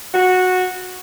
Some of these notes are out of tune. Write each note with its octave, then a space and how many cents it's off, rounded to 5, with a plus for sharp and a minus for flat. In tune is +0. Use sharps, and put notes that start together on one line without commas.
F#4 -10